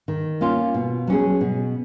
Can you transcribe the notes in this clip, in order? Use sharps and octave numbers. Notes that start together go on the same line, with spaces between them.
D#3
A#3 C#4 F4
B2
F#3 C#4 G#4
B2